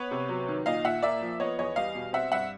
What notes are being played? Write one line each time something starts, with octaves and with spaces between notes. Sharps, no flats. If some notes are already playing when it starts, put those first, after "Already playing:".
Already playing: B3 B4 C#5
C3
F#3
D#3
A#2 D#5 F5
A#2 E5 F#5
A#3 D5 E5
F3
B3 C#5 D#5
E2 C#5 D#5
G3 D#5 F5
B2
C4 E5 F#5
G2 E5 F#5